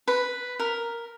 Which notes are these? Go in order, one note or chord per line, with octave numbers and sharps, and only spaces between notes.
B4
A#4